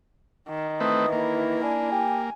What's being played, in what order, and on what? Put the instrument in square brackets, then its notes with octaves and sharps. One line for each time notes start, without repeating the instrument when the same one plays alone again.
[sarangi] D#3
[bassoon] E3 [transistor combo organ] A3 C4 B4 [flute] D#6
[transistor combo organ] A#3 [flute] E4
[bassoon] D4 [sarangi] G#5
[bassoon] G4